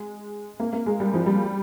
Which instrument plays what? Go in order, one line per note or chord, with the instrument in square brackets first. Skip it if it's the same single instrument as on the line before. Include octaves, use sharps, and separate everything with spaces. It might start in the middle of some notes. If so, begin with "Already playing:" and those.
Already playing: [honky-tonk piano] G#3
A#3
A#3
G#3
G3
F3
G3